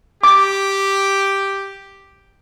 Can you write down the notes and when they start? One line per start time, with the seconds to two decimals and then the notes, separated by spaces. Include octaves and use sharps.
0.24 G4 D6